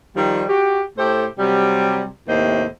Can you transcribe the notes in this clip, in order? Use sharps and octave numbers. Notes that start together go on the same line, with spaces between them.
D#3 F3 G3
F#4 G4
A2 A3 G4 A4 C5
C3 F#3 G3
D#2 A2 C3 C5 D#5